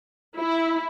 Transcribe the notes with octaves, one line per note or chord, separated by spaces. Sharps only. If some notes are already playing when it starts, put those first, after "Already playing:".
E4